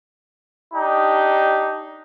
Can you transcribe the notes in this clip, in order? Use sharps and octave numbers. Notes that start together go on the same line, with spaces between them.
D4 D#4 G4